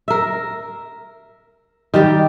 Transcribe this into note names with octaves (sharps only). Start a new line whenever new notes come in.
A#4 E5
D#3 G3 G4